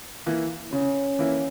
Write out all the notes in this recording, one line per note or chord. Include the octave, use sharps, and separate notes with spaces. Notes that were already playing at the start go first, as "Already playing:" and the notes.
E3 A#3 E4
C#3 C#4
E3 A#3 E4